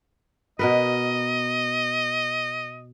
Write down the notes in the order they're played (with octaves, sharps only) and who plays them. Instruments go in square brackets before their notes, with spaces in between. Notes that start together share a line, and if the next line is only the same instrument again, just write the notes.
[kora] B2 A#4 B4 [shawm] D#5